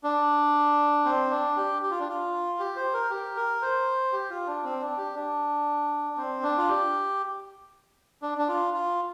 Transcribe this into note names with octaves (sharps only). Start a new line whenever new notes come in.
D4
C4
D4
G4
G4
F4
D4
F4
G4
C5
A#4
G4
A#4
C5
G4
F4
D4
C4
D4
G4
D4
C4
D4
F4
G4
D4
D4
F4
F4